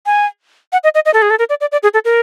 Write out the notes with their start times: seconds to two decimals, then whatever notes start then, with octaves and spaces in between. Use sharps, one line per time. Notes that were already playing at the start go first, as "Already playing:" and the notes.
0.06 G#5
0.72 F#5
0.84 D#5
0.95 D#5
1.06 D#5
1.14 A4
1.22 G#4
1.30 A4
1.39 A#4
1.49 D5
1.61 D5
1.72 D5
1.83 G#4
1.94 A4
2.05 A#4